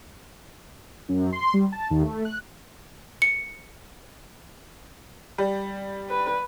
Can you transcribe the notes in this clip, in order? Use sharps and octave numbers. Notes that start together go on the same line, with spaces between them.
F#2
C6
G3
A5
D#2
A3
F#6
C#7
G3
B4